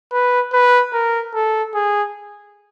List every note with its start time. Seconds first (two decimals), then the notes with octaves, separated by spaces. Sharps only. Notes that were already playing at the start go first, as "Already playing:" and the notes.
0.12 B4
0.53 B4
0.93 A#4
1.34 A4
1.75 G#4